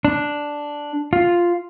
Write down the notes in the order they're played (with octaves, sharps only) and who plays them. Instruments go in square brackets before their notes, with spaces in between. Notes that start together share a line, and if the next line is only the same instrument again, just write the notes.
[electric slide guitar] D4
F4